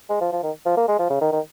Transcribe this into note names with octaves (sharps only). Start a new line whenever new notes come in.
G#3
F3
F3
D#3
F3
A#3
G#3
F3
C#3
D#3
D#3